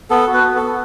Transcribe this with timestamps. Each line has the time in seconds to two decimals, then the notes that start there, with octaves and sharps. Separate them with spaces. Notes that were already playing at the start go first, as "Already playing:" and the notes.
0.10 B3 A4
0.27 F#4
0.34 B4
0.44 B3
0.56 A4
0.62 B3